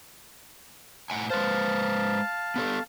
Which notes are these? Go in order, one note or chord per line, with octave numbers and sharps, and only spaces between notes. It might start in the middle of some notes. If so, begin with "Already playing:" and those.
A2 F#5 G#5
G#3 B4 C5 F5 A5
B3 G4 A4